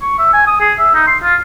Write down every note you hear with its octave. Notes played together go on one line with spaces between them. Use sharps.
C#6
E5
G#5
D#6
G#4
E5
D#4
C6
F4